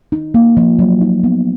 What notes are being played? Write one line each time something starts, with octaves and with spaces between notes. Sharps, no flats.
D#4
A#3
F3
F#3
D#4
B3